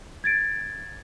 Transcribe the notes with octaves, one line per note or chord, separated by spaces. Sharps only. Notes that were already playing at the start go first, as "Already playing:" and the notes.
G#6 A6 D7